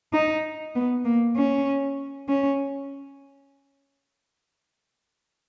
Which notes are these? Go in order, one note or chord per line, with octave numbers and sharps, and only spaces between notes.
D#4
B3
A#3
C#4
C#4